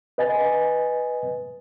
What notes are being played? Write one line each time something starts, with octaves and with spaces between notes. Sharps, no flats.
B4 D#5 G#5 A6